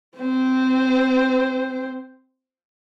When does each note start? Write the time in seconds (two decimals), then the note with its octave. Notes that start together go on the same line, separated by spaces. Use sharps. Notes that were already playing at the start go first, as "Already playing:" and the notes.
0.18 C4 C5